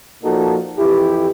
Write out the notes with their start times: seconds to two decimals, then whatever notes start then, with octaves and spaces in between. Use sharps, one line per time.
0.22 A#2 F3 A#3 D#4 F#4 A4
0.77 F2 E3 E4 G4